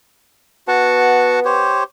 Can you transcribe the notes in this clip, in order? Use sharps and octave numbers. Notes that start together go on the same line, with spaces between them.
B3 F#4 F#5 A5
G4 C5 C#5